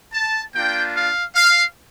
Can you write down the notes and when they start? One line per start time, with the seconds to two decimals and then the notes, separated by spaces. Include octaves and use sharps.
0.13 A5
0.54 A#3 D4 F4 G5
0.95 F5
1.35 F5